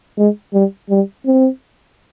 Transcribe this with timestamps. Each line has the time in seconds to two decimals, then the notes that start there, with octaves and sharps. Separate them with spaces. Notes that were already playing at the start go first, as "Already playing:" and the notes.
0.18 G#3
0.53 G3
0.90 G3
1.26 C4